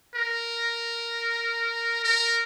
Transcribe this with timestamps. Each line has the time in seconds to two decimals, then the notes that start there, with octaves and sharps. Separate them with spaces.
0.15 A#4
2.04 A#4